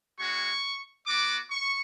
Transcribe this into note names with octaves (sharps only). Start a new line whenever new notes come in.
G#3 C#4 F#4 C#6
B3 F#4 D6
C#6